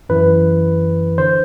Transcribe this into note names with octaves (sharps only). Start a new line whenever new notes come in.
F#2 E3 B4
D3 C5